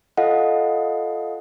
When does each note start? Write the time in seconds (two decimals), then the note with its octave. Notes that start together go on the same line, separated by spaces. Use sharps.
0.17 F4 A4 D#5 F5 F#5